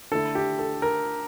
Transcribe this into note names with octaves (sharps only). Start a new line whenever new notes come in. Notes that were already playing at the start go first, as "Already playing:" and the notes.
D3 A3 E4 A4
G4
A4
A#4